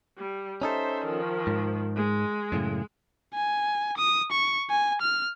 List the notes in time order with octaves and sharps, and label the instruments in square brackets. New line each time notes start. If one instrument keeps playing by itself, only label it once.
[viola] G3
[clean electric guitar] C#4 D#4 A4 [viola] C5 E5
[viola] D#3 F3
[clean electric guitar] G#2
[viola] G#3
[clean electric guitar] F#2 A2 C#3
[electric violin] G#5
D#6
C#6
G#5
F6